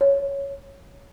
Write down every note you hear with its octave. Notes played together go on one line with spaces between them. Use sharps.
C#5